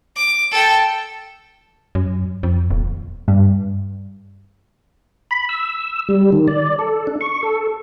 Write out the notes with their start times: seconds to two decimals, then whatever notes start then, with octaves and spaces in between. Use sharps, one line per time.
0.16 D6
0.51 A4 G5
1.95 F#2
2.43 F2
2.71 D#1
3.28 G2
5.31 B5
5.49 E6
6.09 G3
6.32 D#3
6.48 D5
6.79 A4
7.07 D4
7.21 C#6
7.43 A4